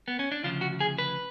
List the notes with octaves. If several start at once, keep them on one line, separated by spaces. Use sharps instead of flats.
B3
C#4
D4
D2 C#3 F3 F4
F#4
G#4
B4